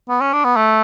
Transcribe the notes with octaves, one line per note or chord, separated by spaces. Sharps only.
B3
C#4
D4
B3
A3